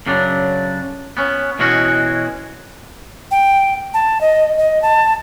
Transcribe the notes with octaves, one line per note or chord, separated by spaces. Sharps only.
F#2 C#3 F#3 D4
B3 C#4
B2 E3 G#3 C#4 F#4
G5
A5
D#5
D#5
A5